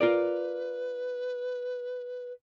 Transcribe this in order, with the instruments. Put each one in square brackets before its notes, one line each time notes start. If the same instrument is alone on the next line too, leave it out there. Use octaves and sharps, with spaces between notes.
[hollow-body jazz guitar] F4 A#4 D5 [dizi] B4